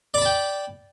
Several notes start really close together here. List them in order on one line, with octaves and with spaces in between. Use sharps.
D5 B5 A5 G5